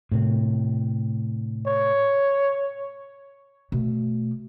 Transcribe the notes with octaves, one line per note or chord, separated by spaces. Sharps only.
A2 C3
C#5
B2 A3